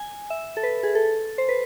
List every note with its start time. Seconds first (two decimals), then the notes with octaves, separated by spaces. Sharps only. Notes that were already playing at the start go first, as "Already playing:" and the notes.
Already playing: G#5
0.30 E5
0.57 A4
0.63 B4
0.83 G#4
0.95 A4
1.38 C5
1.49 B4